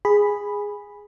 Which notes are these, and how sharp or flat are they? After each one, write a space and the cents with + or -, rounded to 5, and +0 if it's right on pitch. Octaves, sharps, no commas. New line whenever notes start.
G#4 -10 B5 +0